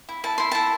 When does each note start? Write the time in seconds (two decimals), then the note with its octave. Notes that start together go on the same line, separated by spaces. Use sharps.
0.09 E4
0.24 E4 A5
0.38 E4 C6
0.52 E4 A5